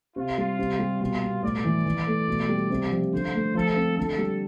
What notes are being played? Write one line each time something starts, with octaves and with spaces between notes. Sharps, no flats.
C3 F4
G3
C3
G3
B2 F4
B3
A2 D5
E3
E3
A3
B2
G3
C3
F3
D3 C5
A3
F3 A4
C4
D3 A4
G3